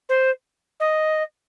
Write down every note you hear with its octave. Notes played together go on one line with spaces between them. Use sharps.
C5
D#5